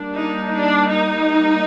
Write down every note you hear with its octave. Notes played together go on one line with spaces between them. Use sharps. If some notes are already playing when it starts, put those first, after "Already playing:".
Already playing: G3 A#3 D4
D#4
D4
D#4